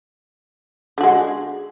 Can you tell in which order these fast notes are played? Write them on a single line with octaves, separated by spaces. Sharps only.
D3 F#4 G#3